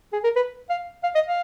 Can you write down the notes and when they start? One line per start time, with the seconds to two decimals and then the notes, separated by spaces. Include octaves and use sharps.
0.13 G#4
0.24 A#4
0.36 B4
0.70 F5
1.04 F5
1.15 D#5
1.26 F5